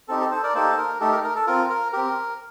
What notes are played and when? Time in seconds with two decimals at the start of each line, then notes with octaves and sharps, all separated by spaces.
0.08 C4 D#4 G4 A4
0.20 A4
0.31 A4 C5
0.43 A#4 D5
0.54 A#3 D#4 G4 A4 C5
0.77 A#4
1.00 A3 D#4 G4 A4
1.12 A#4
1.24 A#4
1.35 A4
1.47 C4 F4 A#4
1.69 A#4
1.92 C4 G4 A#4